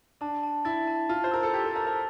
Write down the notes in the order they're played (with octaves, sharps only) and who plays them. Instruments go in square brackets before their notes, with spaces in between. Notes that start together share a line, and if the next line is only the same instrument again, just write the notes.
[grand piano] D4 [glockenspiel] A5
[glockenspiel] A5
[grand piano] E4 [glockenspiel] A6
[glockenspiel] A5
[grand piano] F4 [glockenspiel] A5
[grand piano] C5
[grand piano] A#4 [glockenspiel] E6
[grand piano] A4
[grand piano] G4 [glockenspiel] A6
[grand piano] A4
[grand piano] A#4 [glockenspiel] A5
[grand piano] A#4